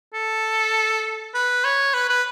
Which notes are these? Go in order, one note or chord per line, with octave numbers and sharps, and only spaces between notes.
A4
B4
C#5
B4
B4